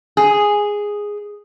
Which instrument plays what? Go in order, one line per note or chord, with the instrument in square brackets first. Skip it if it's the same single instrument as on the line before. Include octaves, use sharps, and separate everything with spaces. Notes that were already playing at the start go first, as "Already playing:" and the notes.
[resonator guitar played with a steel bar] G#4